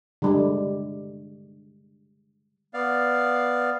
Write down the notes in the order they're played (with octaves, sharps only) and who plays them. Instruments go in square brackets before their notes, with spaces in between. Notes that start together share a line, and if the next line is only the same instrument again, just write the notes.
[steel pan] D3 G3 G#3
[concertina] B3 D5 F5